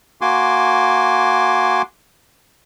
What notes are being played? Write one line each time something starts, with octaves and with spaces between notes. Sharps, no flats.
A#3 F#4 G#5 C6 D6